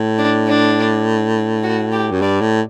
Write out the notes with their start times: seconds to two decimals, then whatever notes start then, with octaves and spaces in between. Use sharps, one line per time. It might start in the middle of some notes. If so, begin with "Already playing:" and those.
Already playing: A2
0.18 D4
0.47 D4
1.63 F#4
1.92 G4
2.12 F#2
2.21 G2 D5
2.41 A2